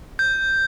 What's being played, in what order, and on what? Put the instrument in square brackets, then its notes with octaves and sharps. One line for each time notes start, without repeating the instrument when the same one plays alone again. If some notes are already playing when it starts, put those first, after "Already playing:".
[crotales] G6